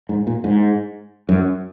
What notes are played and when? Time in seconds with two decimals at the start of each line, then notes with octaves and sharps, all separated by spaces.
0.09 G#2
0.27 A#2
0.44 G#2
1.29 F#2